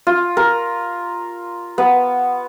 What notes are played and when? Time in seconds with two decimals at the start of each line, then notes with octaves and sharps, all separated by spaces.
0.07 F4
0.37 A#4
1.78 B3